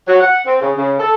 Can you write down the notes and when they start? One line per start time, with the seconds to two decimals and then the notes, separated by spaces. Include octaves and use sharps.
0.08 F#3
0.20 F#5
0.46 C4
0.61 C#3
0.77 C#3
0.99 A4